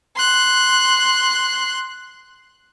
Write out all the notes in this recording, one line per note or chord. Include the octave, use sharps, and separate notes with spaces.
C6 F#6